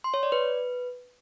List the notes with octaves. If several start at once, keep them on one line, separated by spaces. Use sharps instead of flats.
C6
C#5
D5
B4